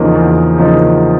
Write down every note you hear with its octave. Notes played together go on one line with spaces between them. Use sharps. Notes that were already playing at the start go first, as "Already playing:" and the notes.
Already playing: E2 C#3 F3 A#3 D#4
E2
C#3 F3 A#3 D#4